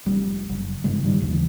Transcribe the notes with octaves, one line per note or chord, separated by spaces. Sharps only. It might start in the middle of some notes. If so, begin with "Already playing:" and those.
F1 G3
F#1
G2 C#3 G#3
D#3 G3
A1 D#2 C#3 E3